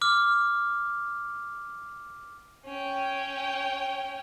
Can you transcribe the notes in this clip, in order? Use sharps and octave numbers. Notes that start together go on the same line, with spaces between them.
D6 F6
C#4 G5